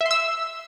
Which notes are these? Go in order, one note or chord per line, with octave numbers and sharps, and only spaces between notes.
E5
C6
E6